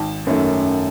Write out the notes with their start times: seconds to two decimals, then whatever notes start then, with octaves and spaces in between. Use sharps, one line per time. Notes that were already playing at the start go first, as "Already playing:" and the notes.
Already playing: G#1 A5
0.27 F#2 D#3 A3